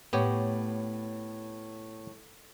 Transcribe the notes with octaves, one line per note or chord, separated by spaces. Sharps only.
A2 B3 G4 C#5